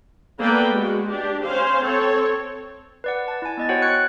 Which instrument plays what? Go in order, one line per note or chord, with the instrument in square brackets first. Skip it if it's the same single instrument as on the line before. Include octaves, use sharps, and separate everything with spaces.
[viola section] A#3 B3 A4 B4 D5 G5
G#3 F#4
D4 G4
C#4 C5 F5
C4 A4 C#5
[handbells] B4 D5 F#5
A5
E4 G#5
B3 D#5 A6
F#4 C5 C#5 F#5 G5
C#6 F#6 G#6 C#7